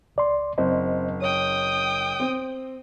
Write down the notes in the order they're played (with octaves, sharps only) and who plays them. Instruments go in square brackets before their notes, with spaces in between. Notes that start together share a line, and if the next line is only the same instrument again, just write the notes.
[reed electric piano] C#2 D5 C6
[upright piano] F#1 [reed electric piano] C4 C5 D#5
[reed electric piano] C#5 [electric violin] G5 D#6
[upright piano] C4